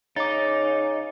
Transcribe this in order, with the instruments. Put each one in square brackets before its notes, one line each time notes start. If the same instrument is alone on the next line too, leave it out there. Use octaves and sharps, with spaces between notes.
[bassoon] C#3 [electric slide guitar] D#4 [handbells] D6 A6